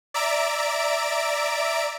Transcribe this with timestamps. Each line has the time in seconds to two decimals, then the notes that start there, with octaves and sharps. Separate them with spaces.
0.14 D5 E5 A#5 D7